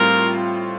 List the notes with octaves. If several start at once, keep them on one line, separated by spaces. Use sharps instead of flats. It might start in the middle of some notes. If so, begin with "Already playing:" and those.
Already playing: A2 G3 C4 F4 A#4